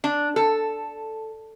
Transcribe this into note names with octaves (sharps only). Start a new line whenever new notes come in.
D4
A4